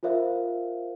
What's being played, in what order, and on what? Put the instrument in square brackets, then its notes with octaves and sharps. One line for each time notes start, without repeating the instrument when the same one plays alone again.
[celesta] F4 A#4 C5 E5 F5